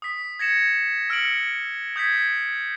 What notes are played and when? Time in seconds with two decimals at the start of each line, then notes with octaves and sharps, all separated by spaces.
0.02 D#6 B6
0.39 G#6 A#6 C#7 E7
1.10 E6 F6 C#7 D7 F#7
1.96 D#6 G6 G#6 B6